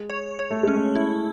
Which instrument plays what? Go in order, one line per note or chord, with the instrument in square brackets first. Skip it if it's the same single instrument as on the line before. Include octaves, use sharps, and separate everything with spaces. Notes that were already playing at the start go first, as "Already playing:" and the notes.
Already playing: [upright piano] G#3
[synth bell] C#5
C#5
[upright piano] A3
[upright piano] G#3 [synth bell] C#4
[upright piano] A3
[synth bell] E4